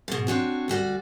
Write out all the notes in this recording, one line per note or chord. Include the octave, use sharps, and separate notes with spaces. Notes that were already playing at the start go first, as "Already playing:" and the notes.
G#2 B2
C4 D4 F#4 C#5
D2 G3 F#4 D5